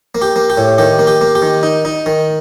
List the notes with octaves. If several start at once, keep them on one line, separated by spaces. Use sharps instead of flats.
A#3
G4
A#3
G4
A2
D#3 G4
A#3
G4
A#3
G4
D#3
D#4
D#4
D#3